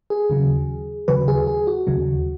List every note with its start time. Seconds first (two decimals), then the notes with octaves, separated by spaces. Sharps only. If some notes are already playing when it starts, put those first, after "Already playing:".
0.10 G#4
0.30 D#2 C#3 F#3
1.08 D#2 C#3 F#3 B4
1.28 G#4
1.47 G#4
1.67 F#4
1.87 D#2 C#3 F#3